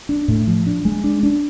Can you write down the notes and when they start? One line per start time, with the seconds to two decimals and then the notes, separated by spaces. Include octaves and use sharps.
0.09 D4
0.28 A2
0.47 F3
0.66 D4
0.85 G#3
1.04 D4
1.23 D4